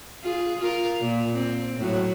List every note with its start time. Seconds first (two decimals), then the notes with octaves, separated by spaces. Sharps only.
0.23 F4 G#4
0.59 F4 A#4
1.01 A#2
1.33 C4
1.77 A2 F#3 F#4